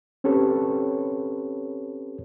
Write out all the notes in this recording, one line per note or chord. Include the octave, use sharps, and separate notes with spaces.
C4 C#4 G4 A4 B4 C#5